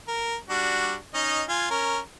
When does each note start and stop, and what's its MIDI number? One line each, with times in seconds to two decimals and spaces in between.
0.08 0.36 70
0.50 0.95 55
0.50 0.95 62
0.50 0.95 66
1.14 1.43 61
1.14 1.43 63
1.14 1.43 75
1.49 1.69 65
1.49 1.69 80
1.71 1.99 61
1.71 1.99 70